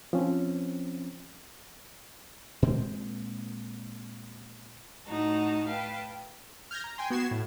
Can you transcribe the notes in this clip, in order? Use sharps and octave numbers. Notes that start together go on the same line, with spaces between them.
F3 C4 C#4
A#2 G#3 C4
A2 D#4 F#4 A5 A#5
B4 F5 G5 A5
F6 G6 G#6 A#6
A#5
G5 G#5 C6
B3 F#4 G#6 C7 E7
A2